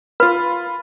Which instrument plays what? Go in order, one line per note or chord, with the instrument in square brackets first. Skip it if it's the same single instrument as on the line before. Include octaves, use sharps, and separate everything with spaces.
[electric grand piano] F4 B5 [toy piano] B4